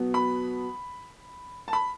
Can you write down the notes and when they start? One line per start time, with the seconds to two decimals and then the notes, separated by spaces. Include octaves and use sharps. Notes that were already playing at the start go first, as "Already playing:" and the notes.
Already playing: B2 F#3 B3
0.14 B5
1.68 A5
1.73 B5